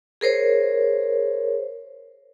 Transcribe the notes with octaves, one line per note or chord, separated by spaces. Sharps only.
G#4 A#4 C5 C#5